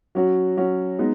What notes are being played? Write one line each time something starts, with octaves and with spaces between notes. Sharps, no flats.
F#3 C#4 F#4
F#3 C#4 F#4
G#3 B3 D#4